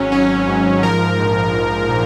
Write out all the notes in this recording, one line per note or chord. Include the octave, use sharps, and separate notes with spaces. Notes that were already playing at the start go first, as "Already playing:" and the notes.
Already playing: G#1 F#3 C#4
G#1 C#4
G#2
F3 A#4
A#1
A#1
A#2